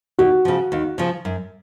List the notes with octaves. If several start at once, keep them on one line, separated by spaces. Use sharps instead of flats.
D#2 F#4
C#3 F3
D#2
C#3 F3
F#2